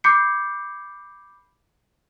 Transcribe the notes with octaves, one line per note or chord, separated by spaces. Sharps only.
B5 D6 G6 C7 C#7